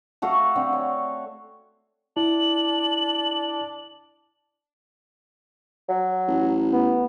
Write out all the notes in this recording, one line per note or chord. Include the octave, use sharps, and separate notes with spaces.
A3 F#4 A4 F5
D3 C4
C#5
D4 E4 F#7
F#3
A1
B3